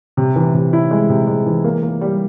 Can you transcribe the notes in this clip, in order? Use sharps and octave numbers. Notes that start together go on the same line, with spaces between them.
C3
E3
C3
E4
G#3
C3
G#3
E3
A#3
A#3
G3